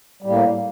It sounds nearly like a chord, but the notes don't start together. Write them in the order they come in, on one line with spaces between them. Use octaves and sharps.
G3 A2 A#3